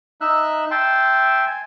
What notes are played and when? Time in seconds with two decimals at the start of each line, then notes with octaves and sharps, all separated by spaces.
0.21 D#4 E5 E6 F#6
0.71 E5 G5 A5 C6
1.47 G#5